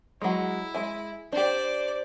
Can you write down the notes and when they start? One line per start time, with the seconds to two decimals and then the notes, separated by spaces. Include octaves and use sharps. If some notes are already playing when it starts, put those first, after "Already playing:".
0.22 F#3 G#3 E4
0.74 G#3 E5 G#5
1.33 D4 G4 C5 D5